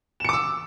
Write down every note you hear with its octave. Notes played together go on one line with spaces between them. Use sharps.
D6 E6 C#7 E7